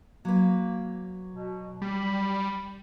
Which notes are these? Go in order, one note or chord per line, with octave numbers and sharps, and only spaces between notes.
F#3 A#3 B4
B2
G3 B5